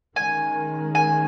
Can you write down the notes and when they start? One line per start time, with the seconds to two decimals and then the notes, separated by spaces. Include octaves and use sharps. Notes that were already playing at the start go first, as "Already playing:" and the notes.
0.16 D#3 G#3 C#4 G#5
0.95 G#5